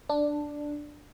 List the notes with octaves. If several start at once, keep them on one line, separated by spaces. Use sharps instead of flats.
D4